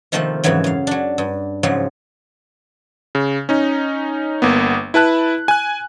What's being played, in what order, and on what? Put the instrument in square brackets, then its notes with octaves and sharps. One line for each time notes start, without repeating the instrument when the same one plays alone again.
[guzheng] C3 D#3 F3 A3 A#3 C4
F2 G#2 C#3 E3 F#3
F#2 F5
F#3 D4
G2
G#2 C#3 F3 F#3
[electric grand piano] C#3
C#4 D#4
G1 A#3 B3
E4 B4 A5 F#6
G#5 F#6